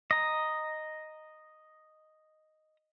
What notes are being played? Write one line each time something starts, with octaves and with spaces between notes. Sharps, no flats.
D#5 A#5